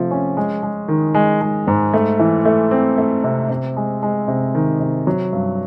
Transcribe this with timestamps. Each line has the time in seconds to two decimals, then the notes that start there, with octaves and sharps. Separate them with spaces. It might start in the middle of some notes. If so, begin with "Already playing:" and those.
Already playing: C3 F3 A3
0.11 C#4
0.37 G#3
0.63 G#3
0.88 D#3
1.15 G#3
1.41 G#3
1.67 G#2
1.94 A3
2.19 E3
2.45 A3
2.71 C4
2.98 A3
3.24 C3
3.49 C3
3.77 G#3
4.03 G#3
4.28 C3
4.55 D#3
4.80 C3
5.07 F#3
5.33 G2